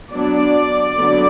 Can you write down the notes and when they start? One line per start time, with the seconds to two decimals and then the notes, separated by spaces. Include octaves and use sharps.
0.12 F#3 B3 D4 D5
0.96 D3 F#3 B3